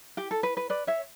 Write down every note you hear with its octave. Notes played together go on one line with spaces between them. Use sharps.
G4
A4
B4
B4
B4 D5
C#5 E5